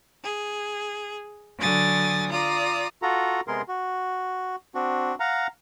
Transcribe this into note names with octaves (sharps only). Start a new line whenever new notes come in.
G#4
D3 F#3 G#5 D#6 A6
F4 D5 A#5 D#6
F4 F#4 A4 A#5
C3 G#3 B3 G#4 A#4 C6
F#4
C4 D4 F#4
F5 F#5 A#5